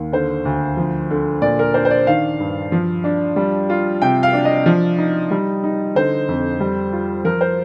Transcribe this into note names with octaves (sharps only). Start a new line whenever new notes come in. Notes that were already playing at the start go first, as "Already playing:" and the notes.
Already playing: D#2
D3 C5
D2
F3
D3
A#2 D5
A#4
D4 C5
C5
D5
D#3 F5
G2
F3
D4
G3
F4
C3 G5
F5
D4
D#5
F3
D#4
G3
D#4
D3 C5
F2
G3
F4
F3 A#4
C5